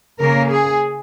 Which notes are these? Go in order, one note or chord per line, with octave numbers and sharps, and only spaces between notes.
C#3 A#3 C#4 A#4
G#4